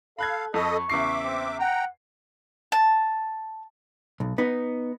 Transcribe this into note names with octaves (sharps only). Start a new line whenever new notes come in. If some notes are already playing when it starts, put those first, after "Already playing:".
A4 F5 B5 F#6 G#6
F2 A4 D#5 C#6 D#6
E2 C#3 E5 D6 C7
C4
F#5 G5 A#5
A5
B1
B3 D#4